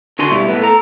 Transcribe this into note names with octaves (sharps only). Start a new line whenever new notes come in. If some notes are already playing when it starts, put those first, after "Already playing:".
D3 F#4 G#5 C6
B2 G3 E4
A2 A3 B3
A4 A#5